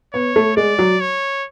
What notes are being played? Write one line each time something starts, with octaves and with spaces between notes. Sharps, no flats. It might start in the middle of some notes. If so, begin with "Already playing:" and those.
B3 C#5
A3
G#3 D5
F#3
C#5